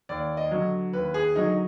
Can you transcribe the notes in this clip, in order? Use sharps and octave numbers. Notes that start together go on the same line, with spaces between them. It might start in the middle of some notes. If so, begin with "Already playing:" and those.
D#2 D5
D#5
D3 F#3
D#2 B4
G#4
D3 F#3 D#4